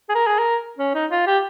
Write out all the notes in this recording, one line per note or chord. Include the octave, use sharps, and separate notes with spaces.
G#4
A#4
G#4
A#4
C#4
D#4
F4
G4